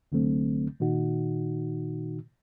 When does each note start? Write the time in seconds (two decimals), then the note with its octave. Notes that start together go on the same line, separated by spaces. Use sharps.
0.12 C2 D3 F#3 A3 C4
0.80 A#2 D#3 D#4 F#4